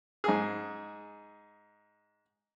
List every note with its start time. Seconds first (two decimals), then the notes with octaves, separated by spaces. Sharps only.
0.24 G#2 G#4